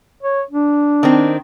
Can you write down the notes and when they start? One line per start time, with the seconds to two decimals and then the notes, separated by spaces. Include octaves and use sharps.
0.23 C#5
0.51 D4
1.03 D#3 C4